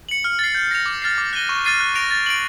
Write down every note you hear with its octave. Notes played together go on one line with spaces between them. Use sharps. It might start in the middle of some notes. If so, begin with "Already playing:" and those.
C#7 F#7
F6
A6 C7
G6
A#6 C#7 F7
D6
F6 A6 C7
D6
F#6 A#6 D#7 G7
C#6
F6 A6 C7 D#7
F#6
A#6 D7 F7
A6
D7 F#7